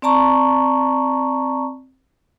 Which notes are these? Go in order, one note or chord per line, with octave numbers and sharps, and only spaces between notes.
C4 D5 A5 A#5 C#6